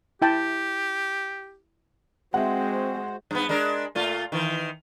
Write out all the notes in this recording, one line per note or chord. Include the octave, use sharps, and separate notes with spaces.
E4 G4 G5 A5
G#3 C4 F#4 C5 E5 F#5
G2 B3
G#3 D4 A#4
A#2 A3 F4
D#3 E3